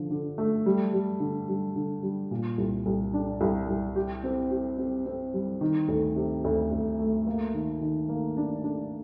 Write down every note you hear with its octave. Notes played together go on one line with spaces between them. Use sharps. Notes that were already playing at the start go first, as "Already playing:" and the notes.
Already playing: D3 F3
D3
A3
G3
G3
D3
G3
D3
G3
A#2
C2
C2
D4
C2
C2
G4
C4
G4
C4
C4
G3
D#3
D2
C3
D2
D2
A3
A#3
D#3
D#3
A#3
D4
D4